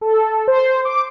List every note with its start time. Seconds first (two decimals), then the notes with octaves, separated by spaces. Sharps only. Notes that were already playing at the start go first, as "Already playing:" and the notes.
0.01 A4
0.48 C5
0.85 D6